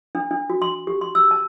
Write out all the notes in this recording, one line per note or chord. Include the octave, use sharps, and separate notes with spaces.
D4
D4
F#4
C6
G4
C6
E6
A5